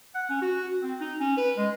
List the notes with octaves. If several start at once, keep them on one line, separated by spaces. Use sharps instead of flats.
F#5
C#4
F#4
C4
D#4
C#4
B4
G#3